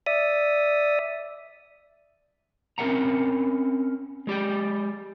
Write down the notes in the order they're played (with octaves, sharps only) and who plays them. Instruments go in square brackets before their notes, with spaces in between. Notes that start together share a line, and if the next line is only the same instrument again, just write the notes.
[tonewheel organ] D5 E5 D#6
[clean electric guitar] C4 C#4 A#4 E5 F#5 A#5
G#3 G4 D5 G5